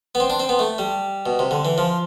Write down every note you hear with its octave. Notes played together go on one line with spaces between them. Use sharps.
B3
C4
D4
C4
B3
A3
G3
B2
C3
D3
E3
F3